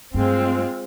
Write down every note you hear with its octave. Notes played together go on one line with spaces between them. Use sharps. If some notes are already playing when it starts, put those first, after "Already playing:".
G2 G#3 A3 C4 F4